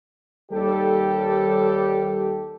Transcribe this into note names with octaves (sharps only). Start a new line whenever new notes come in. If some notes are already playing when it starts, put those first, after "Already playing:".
D#2 G3 G4 A4